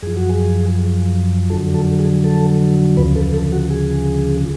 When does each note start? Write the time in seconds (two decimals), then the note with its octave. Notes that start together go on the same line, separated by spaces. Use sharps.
0.02 F#2 F3 G#4
0.17 F#4
0.30 G#4
1.49 F2 D3 F#3 A4
1.74 A4
1.99 G#4
2.24 A4
2.97 D2 C#3 F3 B4
3.16 A4
3.34 A4
3.52 F#4
3.71 G#4